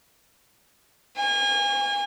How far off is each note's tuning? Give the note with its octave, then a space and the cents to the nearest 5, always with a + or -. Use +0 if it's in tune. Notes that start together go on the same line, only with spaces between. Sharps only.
G#5 -35